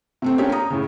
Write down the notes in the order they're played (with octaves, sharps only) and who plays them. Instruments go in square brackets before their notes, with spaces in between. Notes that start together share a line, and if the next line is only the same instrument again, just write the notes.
[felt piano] C3 A3 C4
A#3 C#4 D4 F4 G4
A#5 D#6
A2 C#3